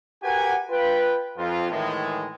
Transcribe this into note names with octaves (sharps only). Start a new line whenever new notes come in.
F#4 G4 A#4 B4 F#5 G#5
F4 B4 G5
F2 F4
A2 D#3 E3 G#3